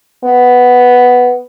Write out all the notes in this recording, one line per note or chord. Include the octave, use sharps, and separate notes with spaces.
B3